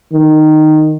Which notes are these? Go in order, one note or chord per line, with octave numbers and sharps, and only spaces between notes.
D#3